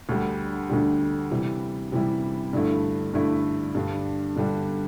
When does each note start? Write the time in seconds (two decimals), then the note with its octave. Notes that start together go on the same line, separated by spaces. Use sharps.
0.09 D2 D3 G3
0.69 D2 D3 G3
1.31 C3 E3 G3 E4
1.92 C3 E3 G3 E4
2.53 G2 D3 A3 E4
3.14 G2 D3 A3 E4
3.75 G2 D3 G3 D4
4.36 G2 D3 G3 D4